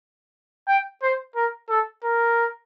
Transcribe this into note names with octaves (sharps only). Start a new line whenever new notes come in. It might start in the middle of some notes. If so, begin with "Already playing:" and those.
G5
C5
A#4
A4
A#4